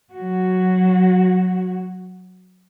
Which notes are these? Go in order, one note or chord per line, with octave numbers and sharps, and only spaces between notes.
F#3 F#4